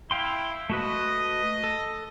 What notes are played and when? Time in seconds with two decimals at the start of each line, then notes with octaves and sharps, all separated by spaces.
0.11 E4 F5 G5 C6
0.70 A3 F#4 B4 D#5
1.64 A4